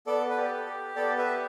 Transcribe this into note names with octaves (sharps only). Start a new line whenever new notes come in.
B3 A4 D5
B4
G4 D5
B4
A4
G4
B3 A4 D5
B4 E5
G4